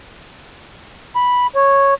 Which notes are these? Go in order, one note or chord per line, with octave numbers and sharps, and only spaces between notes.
B5
C#5